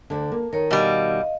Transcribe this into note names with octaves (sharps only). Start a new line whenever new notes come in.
D2 D3
A#3
D#3 A#4 C#5 A#5
B2 G3 D#5 F5